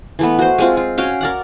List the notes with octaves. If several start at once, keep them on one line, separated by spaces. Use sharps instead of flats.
E3 A3 B3
F#4 C5
G#3 C4 F4
F4
C#4 F#4 F5 G5
A#4 D5 F#5